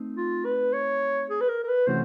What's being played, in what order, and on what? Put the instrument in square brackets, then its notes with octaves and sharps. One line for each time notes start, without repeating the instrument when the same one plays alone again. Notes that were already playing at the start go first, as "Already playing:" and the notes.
Already playing: [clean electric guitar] A3 C4 D#4
[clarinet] F4
B4
C#5
G#4
B4
A#4
A#4
B4
[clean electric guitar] C3 E3 A3 C#4 F#4 [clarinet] C5